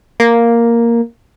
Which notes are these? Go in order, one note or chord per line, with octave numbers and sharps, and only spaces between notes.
A#3